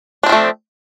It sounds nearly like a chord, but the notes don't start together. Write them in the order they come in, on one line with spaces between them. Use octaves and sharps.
D4 C4 F3 A3